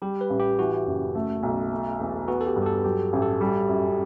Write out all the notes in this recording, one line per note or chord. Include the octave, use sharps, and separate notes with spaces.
G3 G4
B4
A1
G4
E3 F#4
F#1
A3
B1
A3
E2
B3 F#4
A4
G4
G2
G4
A4
F#3 G4
A1 G4
A4
G3
F#2